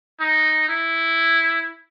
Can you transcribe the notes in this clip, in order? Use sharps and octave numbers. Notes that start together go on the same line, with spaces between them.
D#4
E4